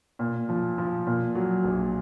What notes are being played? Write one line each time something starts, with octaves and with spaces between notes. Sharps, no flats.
A#2
F3
F3
A#2
F#3
A#1